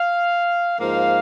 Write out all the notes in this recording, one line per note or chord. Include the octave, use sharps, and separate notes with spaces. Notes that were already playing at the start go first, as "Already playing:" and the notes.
Already playing: F5
G#2 F3 A#3 F5